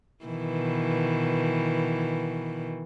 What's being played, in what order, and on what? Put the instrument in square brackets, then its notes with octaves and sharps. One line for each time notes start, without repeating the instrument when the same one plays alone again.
[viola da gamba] B2 D#3 E3